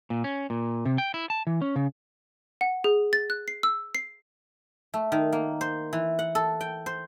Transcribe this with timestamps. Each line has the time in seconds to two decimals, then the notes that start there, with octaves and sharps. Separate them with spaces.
0.10 A#2
0.24 C#4
0.50 A#2
0.85 C3
0.98 G5
1.14 E4
1.30 A5
1.47 E3
1.62 C#4
1.76 C#3
2.61 F#5
2.84 G#4
3.13 A6
3.30 F#6
3.48 C7
3.63 E6
3.95 C7
4.94 A3
5.12 D#3
5.32 A#3
5.61 C5
5.93 E3
6.19 F#5
6.35 A4
6.61 G5
6.86 C5